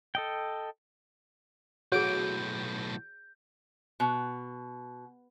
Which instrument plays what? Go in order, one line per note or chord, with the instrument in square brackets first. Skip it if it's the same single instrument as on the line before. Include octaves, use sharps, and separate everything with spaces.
[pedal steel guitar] A4 D#5 G5
[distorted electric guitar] B1 A2 [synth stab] F#4 D7 [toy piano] G#4 C#5 [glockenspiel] G6
[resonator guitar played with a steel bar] B2